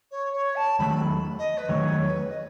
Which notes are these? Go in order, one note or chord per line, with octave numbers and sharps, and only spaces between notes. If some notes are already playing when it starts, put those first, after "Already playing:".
C#5
C#5
A5
E2 D#3 F#3 A3 B5
D#5
B4
E2 D#3 F#3 A3 C#5
C#5
B4
D#5